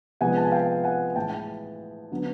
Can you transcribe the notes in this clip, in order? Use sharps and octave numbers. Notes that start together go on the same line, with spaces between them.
C3 F3 G#3 B3 F#5 G#5
A5
G#5
F5 G5
F#5 G#5
A2 E3 G#3 G5 A5
D3 F#3 B3